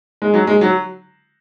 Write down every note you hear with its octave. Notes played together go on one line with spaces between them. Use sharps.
G#3
F#3
G#3
F#3